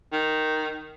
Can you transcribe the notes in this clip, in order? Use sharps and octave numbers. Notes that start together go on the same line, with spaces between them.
D#3